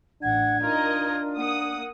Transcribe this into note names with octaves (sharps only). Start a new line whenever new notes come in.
A1 D4 F#5 G#6
D#4 F4 A#4 D#5
A#3 F#5 D#6